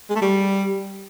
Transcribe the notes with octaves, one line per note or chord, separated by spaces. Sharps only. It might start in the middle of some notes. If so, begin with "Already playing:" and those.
G#3
A3
G3